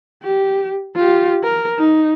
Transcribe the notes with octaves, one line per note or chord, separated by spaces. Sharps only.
G4
F4 G4
A#4
D#4